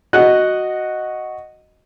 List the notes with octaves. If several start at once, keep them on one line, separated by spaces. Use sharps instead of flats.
F#4 D#5 F#5 F#6